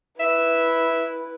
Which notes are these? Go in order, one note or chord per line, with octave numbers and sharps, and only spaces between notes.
E4 B4 E5